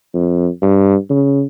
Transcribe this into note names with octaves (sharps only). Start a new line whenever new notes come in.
F2
G2
C#3